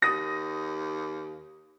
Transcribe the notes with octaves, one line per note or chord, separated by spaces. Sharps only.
D#2 D#6 A#6